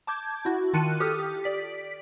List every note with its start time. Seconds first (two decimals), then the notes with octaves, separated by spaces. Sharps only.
0.07 A5 D6 G6 G#6
0.45 E4 F#4
0.74 D#3 F4 A5 F#6 C#7 D#7
1.00 G4 A4 D#6 F6
1.44 D5 B6